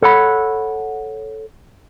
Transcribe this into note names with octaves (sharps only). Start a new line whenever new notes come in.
A4 C#5 F#5 B5